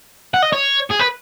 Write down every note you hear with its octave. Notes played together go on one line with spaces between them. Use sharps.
F#5
D#5
C#5
G#4
B4